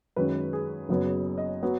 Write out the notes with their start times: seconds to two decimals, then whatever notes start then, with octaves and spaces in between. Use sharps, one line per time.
0.16 F#2 D#3 G#3 C#4 B4
0.53 G#4
0.89 F#1 F#2 C#3 F#3 B3
1.38 D#5
1.63 F#3 B3